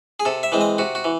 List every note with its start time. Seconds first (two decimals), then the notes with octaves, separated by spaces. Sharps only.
0.20 G#4
0.25 C3 A4
0.43 E5
0.52 E3 G#3 C4
0.61 D#5
0.78 C3 F#4
0.95 F#4
1.04 E3